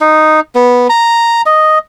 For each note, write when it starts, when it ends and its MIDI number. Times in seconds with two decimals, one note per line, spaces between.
0.01 0.40 63
0.55 0.87 59
0.89 1.42 82
1.46 1.78 75